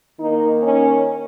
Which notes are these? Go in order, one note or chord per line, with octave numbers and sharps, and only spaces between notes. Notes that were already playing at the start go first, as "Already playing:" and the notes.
D#3 A#3 D#4
C#4